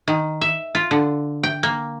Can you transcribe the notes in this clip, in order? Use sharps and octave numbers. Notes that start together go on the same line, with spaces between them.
D#3
E5
F4
D3
G5
A#3